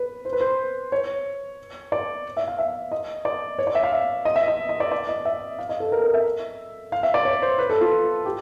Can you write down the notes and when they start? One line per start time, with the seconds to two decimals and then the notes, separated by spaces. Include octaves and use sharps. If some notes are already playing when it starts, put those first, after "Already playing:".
Already playing: B4
0.25 C5
0.33 B4
0.41 C5
0.92 C#5
1.92 D5
2.37 E5
2.48 F5
2.59 E5
2.92 D#5
3.25 D5
3.59 C#5
3.67 D5
3.75 E5
3.83 F5
3.92 E5
4.25 D#5
4.36 E5
4.48 D#5
4.69 D#5
4.80 D5
4.91 D5
5.09 D#5
5.25 E5
5.59 F5
5.69 D#5
5.80 A4
5.92 A#4
6.03 A#4
6.14 E5
6.92 F5
7.03 E5
7.14 D5
7.25 C#5
7.42 C5
7.58 B4
7.70 A4
7.81 F4
8.26 G4